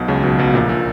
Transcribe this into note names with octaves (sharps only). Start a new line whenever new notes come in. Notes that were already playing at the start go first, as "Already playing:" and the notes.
Already playing: B1 B2
C#2 C#3
B1 B2
B1 B2
A#1 A#2
A#2